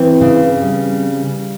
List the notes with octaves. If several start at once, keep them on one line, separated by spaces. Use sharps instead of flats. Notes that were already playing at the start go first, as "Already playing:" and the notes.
Already playing: E3 C4
C#3
G3